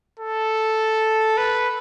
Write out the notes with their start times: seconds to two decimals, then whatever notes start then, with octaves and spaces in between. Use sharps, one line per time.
0.19 A4
1.37 B4